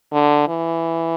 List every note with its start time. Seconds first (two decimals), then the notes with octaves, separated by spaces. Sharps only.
0.13 D3
0.48 E3